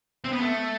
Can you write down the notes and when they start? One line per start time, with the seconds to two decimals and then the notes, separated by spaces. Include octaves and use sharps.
0.25 C4
0.33 B3
0.40 A3